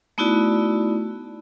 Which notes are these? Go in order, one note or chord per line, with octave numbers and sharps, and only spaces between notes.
A3 B3 D#4 E4 F#4 D5